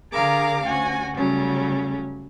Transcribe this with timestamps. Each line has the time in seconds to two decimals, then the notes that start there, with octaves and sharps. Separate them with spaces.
0.12 D3 G#4 A#4 F5 A#5 D6
0.64 D2 C#4 F#4 G#5
1.16 C#3 F#3 G3 A3 C#4